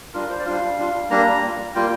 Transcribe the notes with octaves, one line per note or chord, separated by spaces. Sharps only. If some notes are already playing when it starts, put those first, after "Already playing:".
G3 D4 F4 A#4
C5
D5
G3 D4 F4 F5
G3 D4 F4
G3 A#3 D4 A#5
G3 A#3 F4
G3 A#3 F4 G5